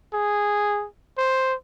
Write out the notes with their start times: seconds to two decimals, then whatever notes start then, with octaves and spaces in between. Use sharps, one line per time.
0.14 G#4
1.18 C5